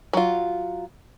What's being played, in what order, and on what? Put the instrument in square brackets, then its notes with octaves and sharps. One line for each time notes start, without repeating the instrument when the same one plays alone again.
[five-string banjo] F#3 F4